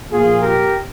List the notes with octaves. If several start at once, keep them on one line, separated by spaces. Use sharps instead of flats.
A#2 F3 A#3 F4 G#4
G4 A#4